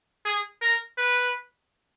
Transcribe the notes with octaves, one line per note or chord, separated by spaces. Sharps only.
G#4
A#4
B4